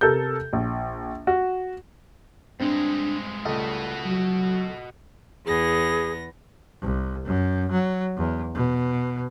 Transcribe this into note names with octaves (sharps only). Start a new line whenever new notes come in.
C3 A4 A#4 G6
A#1
F#4
G2 G#3 C4 D4
C#2 G3 A3 F#4 D#5
F#3 A4
E2 B3 G#4 A#6
C2
F#2
F#3
E2
B2